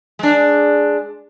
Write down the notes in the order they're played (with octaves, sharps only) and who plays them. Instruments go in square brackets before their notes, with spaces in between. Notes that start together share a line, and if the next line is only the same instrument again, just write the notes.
[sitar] G#3 D4